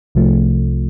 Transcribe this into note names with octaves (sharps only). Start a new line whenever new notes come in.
C2 C3 F3 A3